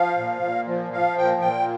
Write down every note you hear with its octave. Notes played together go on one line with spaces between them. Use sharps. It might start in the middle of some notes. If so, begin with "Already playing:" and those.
Already playing: F3 F5
A#2
A#2
F3
F3 F5
A#2 G5
A#2 G5